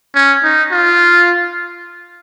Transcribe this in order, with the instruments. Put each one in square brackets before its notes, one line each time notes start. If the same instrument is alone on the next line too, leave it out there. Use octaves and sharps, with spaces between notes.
[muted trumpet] C#4
D#4
F4